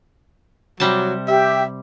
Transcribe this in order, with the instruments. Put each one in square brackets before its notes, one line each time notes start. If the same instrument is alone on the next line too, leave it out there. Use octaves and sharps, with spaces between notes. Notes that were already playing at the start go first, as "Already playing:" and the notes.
[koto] C3 G3 A5 [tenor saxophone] F#3
[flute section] G4 [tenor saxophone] E5